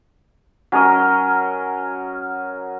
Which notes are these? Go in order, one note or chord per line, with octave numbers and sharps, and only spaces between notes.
F#3 C#4 A#4 D#5